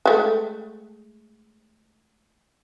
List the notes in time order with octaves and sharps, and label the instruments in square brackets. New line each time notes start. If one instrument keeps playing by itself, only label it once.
[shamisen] G#3 A3